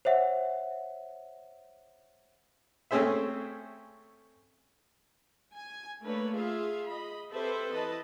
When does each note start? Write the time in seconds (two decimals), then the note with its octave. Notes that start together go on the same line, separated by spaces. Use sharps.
0.05 C5 C#5 E5 F#5
2.91 A3 C4 C#4 G#4 C5 E5
5.54 G#5
6.02 A3 A#3 D4 B4 C#5
6.33 F4 G#4 E5 F5
6.88 D#5 B5
7.31 C4 G4 A4 B4 C5 E5
7.72 E3 B4 D#5 A5